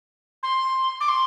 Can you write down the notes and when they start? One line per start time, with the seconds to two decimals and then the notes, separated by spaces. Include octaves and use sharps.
0.42 C6
1.00 D6
1.08 C6